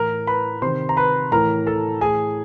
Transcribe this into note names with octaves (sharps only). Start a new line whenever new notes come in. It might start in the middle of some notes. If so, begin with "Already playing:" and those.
Already playing: A2 E3 A#4 A#5
B4 B5
C3 D#3 C5 C6
A#5
B4 B5
A2 E3 A#4 A#5
A4 A5
A2 E3 G#4 G#5